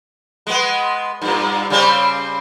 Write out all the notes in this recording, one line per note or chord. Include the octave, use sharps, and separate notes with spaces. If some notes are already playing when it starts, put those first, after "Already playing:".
G#3 B3
G2 A#2
C#3 G3 C4